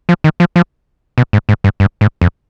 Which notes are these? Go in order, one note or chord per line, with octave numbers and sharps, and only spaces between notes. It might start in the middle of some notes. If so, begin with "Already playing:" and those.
F3
D#3
F3
F3
B2
G#2
G#2
G2
G2
G#2
F2